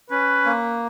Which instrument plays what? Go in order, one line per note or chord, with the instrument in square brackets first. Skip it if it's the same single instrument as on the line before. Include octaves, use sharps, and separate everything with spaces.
[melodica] C#4 [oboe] B4
[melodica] A#3